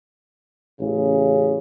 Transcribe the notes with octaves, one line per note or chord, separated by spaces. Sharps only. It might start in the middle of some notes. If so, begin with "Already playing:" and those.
A1 C#3